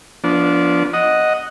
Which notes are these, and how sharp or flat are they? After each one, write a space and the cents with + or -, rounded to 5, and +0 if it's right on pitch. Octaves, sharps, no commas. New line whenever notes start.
F3 +0 B3 -30 D4 -20
D#5 +0 F#5 +0